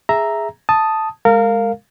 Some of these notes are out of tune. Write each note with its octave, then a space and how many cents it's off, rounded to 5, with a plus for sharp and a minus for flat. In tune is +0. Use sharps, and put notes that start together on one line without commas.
G#4 +0 E5 +0 A#5 +0
A5 +0 D#6 +0
G#3 -5 A#4 -25 F5 +0